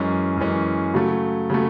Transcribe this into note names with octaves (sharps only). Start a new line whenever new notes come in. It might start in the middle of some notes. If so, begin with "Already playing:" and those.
Already playing: F#2 E3 G#3 C#4
F#2 E3 G#3 C#4
C#3 F#3 A3
C#3 F#3 A3